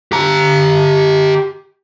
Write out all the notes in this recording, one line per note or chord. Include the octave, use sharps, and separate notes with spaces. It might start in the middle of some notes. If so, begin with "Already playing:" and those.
G4 A#5